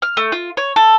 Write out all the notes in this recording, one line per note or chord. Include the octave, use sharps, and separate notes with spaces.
F6
A3
F4
C#5
A4